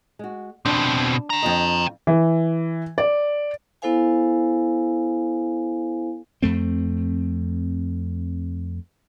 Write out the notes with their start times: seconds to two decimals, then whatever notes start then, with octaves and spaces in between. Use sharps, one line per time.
0.19 G#3 F#4
0.65 B2 C4 D4
1.30 G5 A#5
1.43 F2 F4 D#5
2.07 E3
2.98 D5
3.82 B3 E4 A4 C5 F5 G#5
6.43 F2 A3 C4